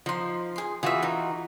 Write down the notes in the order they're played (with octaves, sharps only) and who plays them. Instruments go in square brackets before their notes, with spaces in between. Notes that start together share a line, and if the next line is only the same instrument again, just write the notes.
[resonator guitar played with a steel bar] F3 [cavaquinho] D#4 C6
[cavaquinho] G#4 C6
[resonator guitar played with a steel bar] E3 F4 F#4 [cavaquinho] G#4 E5
[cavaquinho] D#4 A#4